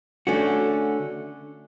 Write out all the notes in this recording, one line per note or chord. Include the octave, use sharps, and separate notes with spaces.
D3 A3 C#4 F#4